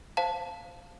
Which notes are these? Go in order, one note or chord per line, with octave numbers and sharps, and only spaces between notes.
C5 F5 A5